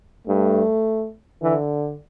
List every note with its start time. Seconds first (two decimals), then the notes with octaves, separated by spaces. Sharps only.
0.27 G2 A3
1.42 D3 E3